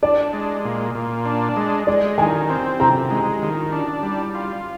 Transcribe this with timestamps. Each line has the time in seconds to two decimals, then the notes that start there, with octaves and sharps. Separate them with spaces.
0.03 D4 D5
0.33 G#3
0.65 A#2
0.95 A#2
1.25 D4
1.56 G#3
1.87 G#3 D5
2.18 D#3 G#5
2.50 C4
2.80 C3 A#5
3.10 G#3
3.42 D#3
3.72 D4
4.03 G3
4.35 F4